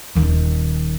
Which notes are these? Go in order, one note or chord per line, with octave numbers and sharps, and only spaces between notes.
D#1 D#3